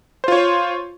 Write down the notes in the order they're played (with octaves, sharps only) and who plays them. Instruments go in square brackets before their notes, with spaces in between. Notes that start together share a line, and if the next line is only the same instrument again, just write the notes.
[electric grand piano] C5
F4
C#5